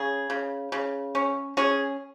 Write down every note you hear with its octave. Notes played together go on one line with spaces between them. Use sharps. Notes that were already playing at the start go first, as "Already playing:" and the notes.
Already playing: C#3 G#4
C#3
C#3
C#4
C#4 G#4